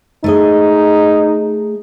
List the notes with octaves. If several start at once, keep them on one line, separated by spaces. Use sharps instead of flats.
A3 D#4 G#4 D#5